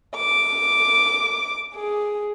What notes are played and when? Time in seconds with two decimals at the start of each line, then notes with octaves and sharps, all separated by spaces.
0.16 D6
1.74 G#4